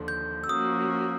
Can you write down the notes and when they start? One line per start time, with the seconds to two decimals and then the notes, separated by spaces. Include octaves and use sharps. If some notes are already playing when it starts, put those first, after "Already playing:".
Already playing: D#2 D3 F3
0.08 G6
0.44 E6
0.49 F3 A#3 C#4 F#4 D#6